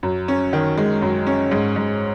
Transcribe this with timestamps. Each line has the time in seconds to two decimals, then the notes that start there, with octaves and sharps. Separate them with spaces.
0.03 F#2
0.28 C#4
0.53 D#3
0.78 G#3
1.02 F#2
1.27 C#4
1.51 G#2
1.76 G#2